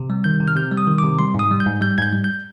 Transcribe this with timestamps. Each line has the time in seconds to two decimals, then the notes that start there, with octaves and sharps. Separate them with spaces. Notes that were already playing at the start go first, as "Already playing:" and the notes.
Already playing: C3
0.10 G3
0.24 D#3 G6
0.40 C3
0.48 F6
0.56 C3 G6
0.72 G3
0.77 D#6
0.87 D#3
0.98 D6
1.04 C3
1.19 G3 C6
1.34 G#2 D#6
1.51 G3
1.60 G6
1.66 G#2
1.81 G3 G6
1.98 G#2 G#6
2.02 G6
2.13 G3
2.24 G6